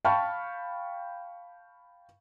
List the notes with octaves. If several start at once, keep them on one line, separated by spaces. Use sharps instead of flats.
F5 G5 A5 B5 C#6 F6